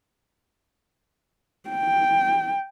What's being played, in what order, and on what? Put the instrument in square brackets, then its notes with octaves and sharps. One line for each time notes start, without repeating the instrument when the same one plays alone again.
[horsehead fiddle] G5